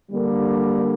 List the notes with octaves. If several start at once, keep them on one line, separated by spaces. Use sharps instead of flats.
D3 G3 A#3